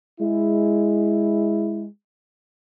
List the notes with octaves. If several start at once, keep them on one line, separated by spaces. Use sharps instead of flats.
G#3 E4